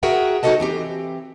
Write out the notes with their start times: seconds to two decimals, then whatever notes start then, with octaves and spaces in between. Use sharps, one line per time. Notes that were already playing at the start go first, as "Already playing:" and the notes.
0.03 F#4 G#4 A#4 E5 F#5 G5
0.43 D#4 F#4 G4 A4 D#5 A5
0.60 E3 C4 G4